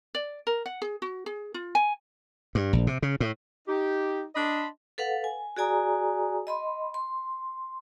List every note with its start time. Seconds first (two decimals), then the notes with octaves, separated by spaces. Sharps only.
0.15 D5
0.47 A#4
0.66 F#5
0.82 G#4
1.02 F#4
1.26 G#4
1.54 F4
1.75 G#5
2.55 G2
2.73 A#1
2.87 C3
3.02 C#3
3.20 A2
3.68 D#4 G4
4.35 D4 D#5 A5 B5 C6
4.98 A4 B4 F5 F#5
5.24 G#5
5.57 F#4 G#4 D5 G#5 A#5 D#6
6.47 D#5 B5 C6
6.94 C6